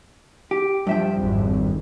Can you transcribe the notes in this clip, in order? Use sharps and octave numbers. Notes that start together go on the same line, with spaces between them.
G4
G2 F3 E5 G5
G#1 F2